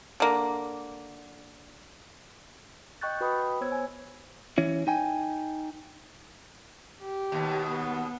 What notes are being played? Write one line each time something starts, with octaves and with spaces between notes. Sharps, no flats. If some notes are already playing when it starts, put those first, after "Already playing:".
D3 A#3
D#5 G5 C#6 F#6 G6 A6
F#4 B4 D#5 G5 B5 D#6
B3 C5 C#5 E6 G#6
G#5
E3 C#4 E4
D#4 G5 G#5
G4
D#2 B2
B3